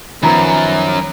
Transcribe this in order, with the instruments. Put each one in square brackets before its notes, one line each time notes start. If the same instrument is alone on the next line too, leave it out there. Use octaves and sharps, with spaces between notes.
[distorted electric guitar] F#2 [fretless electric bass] D#3 F3 B3 [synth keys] A#5 B5